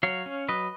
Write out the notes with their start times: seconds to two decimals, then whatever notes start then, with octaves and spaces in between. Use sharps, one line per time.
0.03 F#3 C#5 F5
0.26 C#4
0.49 F#3 B4 D#5